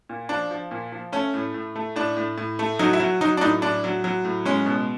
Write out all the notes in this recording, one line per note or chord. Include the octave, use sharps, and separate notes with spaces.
A#2
F3 D4
F3
A#2
F3
A3 C#4
A2
A2
A3
A2 D4
A2
A2
A3
F#3 D#4
E4
F#3
F#3 D#4
D4
A2 D#4
A2 D4
F#3
F#3
A2
G#3 C#4
B2